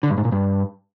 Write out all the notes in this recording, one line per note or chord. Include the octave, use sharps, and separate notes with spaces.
D3
G2
G#2
A#2
G2